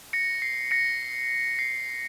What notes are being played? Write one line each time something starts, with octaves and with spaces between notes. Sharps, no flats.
A#6 C#7
C7
A#6 C#7
C7